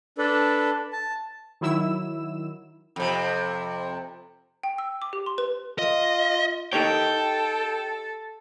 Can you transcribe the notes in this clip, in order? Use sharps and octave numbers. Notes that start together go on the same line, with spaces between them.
D4 A4 B4
A5
D#3 F#3 E4 E6 E7
F2 C3
G5
E6
D6
G4
C6
B4
F4 D#5
D#4 G4 A4 C#5 G5